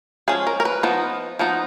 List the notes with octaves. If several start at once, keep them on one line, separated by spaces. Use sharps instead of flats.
F3 G#3 C#4 G#4
A#4
A#4
B4
F3 B3 D#4
F3 B3 D#4